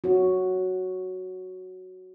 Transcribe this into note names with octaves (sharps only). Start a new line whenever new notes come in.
F#4 C#5